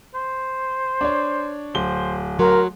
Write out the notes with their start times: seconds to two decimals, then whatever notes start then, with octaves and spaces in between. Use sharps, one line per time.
0.14 C5
1.01 D4 C#5
1.75 D1 C5 G7
2.39 F#3 A#4 C6